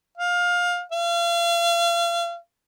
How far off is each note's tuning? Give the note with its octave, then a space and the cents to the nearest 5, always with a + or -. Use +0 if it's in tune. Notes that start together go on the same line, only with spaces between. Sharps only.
F5 +20
F5 -35